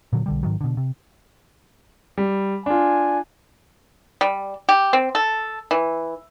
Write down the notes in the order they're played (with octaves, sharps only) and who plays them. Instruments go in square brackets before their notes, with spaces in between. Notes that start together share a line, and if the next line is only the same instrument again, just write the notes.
[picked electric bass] A#2 D3 F#3
B1 D3 G3
G#2 D#3 F#3
B2 D3
C3
[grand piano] G3
[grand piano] D4 F4 [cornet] G#5
[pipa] G3
G4
C4
A4
E3